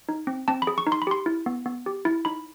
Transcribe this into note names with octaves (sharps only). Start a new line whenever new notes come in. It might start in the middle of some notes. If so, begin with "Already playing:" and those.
D#4
C4
C4 A5
B5
G#4
C#6
D#4
C6
B5
G4 C6
E4
B3
B3
G4
E4
D#4 B5